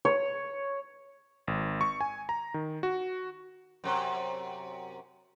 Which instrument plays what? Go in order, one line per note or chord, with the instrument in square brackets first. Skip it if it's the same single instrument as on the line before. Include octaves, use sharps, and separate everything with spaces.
[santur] C#5
[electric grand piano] G#1
C#6
G#5
A#5
D#3
F#4
[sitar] F#2 C3